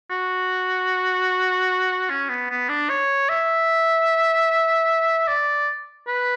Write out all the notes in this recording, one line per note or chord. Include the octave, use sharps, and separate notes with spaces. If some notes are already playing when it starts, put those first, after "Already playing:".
F#4
C#4
B3
B3
D4
C#5
E5
D5
B4